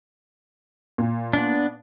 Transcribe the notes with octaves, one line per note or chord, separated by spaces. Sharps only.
A#2
B3 D4